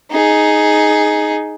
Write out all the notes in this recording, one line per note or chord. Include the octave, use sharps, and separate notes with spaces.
D#4 G#4